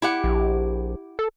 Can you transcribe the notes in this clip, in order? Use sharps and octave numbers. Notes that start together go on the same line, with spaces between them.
E4 G4 F#5
A#1
A4